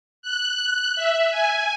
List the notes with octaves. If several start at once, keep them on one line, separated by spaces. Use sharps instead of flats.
F#6
E5
G#5